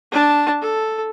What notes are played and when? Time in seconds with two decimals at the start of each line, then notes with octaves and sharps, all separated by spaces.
0.12 D4 A5
0.62 A4